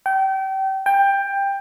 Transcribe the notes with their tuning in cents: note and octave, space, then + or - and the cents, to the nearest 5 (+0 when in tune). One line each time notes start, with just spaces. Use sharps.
G5 -30
G5 +15